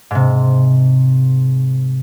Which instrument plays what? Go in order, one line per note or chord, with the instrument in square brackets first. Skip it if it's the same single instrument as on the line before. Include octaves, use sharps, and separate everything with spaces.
[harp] G#2 C3